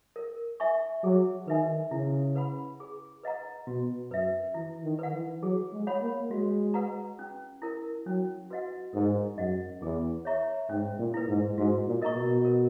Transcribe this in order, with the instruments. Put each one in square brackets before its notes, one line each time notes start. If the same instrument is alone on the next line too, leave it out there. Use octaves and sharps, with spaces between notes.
[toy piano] A#4
E5 G#5 C#6
[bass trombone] F#3 [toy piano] G#4
[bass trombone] D#3 [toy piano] B4 E5 G#5
[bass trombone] C#3 [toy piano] E4
[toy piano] B4 F#5 B5
G#4
B4 D#5 F#5 A#5
[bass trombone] B2 [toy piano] F#4
[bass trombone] F#2 [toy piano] B4 E5
[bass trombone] E3 [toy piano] E4
[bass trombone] D#3
[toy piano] B4 F#5
[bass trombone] E3
[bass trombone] F#3 [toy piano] G#4
[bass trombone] G#3
[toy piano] C#5 F#5 B5
[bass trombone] A#3
[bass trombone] G#3 [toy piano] F#4
[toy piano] B4 F#5 A#5
C#4
E4 A#4
[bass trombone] F#3 [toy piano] C#4
[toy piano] F#4 B4 D#5 F#5
[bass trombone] G#2 [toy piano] A#4
[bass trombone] F#2 [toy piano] D#5 F#5
[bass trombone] E2 [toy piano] G#4
[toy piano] C#5 E5 A#5 C#6
[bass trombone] G#2 [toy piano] C#4
[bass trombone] A#2
[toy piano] E4 B4
[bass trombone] G#2
[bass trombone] G#2 [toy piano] F#4
[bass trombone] A#2
[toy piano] A#4 D#5 A#5 C#6
[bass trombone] B2
[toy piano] A#4